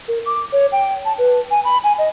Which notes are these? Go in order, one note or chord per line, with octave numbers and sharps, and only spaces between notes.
A#4
D6
C#5
G5
A5
B4
G#5
B5
G#5
D#5